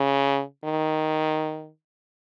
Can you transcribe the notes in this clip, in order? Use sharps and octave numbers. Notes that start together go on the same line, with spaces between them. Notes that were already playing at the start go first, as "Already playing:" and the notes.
Already playing: C#3
D#3